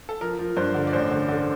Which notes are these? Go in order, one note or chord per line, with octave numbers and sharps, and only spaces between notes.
A4
F3 A#4
F3
G2 C5
D3
D5
A1 C5
D3
D3